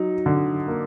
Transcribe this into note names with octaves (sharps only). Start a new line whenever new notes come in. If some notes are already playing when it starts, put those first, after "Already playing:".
Already playing: F#3 D#4
D3
A#3